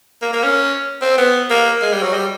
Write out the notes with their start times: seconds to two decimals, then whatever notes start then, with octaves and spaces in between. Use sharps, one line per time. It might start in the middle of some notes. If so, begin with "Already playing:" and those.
0.22 A#3
0.33 A#3
0.43 C#4
1.01 C4
1.18 B3
1.50 A#3
1.82 G#3
1.93 G3
2.03 F#3
2.14 G3